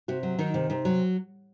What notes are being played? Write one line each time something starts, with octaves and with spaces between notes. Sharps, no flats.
C3 F#4
F#3
D#3 D#4
C3
C3 D#4
F#3